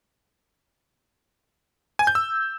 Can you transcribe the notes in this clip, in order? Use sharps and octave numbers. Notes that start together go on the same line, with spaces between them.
G#5
G6
E6